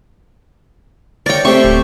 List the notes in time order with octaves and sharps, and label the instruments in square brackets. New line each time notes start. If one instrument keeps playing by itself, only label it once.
[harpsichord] A#4 C#5 [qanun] D5 G5
[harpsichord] A3 G4 C5 [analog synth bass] C4 [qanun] C#6
[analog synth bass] D1